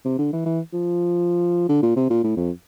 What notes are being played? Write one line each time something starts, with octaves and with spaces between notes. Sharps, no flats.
C3
D3
E3
E3
F3
D3
A#2
C3
A#2
A2
F2